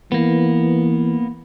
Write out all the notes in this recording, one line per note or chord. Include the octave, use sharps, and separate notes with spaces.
E3 A#3 B3